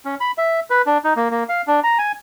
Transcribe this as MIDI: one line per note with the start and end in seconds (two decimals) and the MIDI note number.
0.05 0.15 61
0.20 0.31 83
0.38 0.60 76
0.70 0.82 71
0.87 0.98 62
1.04 1.14 63
1.16 1.28 58
1.31 1.44 58
1.49 1.62 77
1.67 1.80 62
1.83 1.98 82
1.98 2.12 80